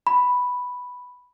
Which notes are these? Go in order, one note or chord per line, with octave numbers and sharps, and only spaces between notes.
B5